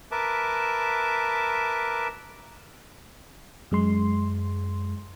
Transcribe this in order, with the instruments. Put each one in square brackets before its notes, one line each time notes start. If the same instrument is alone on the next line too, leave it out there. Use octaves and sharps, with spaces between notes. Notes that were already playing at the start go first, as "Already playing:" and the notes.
[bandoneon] A#4 B4 E5 A5 D6
[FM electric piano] F#2 G#3 C6